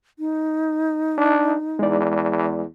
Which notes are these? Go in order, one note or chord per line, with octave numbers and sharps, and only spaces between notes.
D#4
D4
E2 G#3 D5